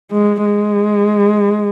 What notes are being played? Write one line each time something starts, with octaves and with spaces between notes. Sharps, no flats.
G#3
G#3